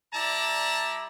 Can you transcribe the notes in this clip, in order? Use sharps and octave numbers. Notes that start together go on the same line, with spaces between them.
G3 E4 D5 A5 A#5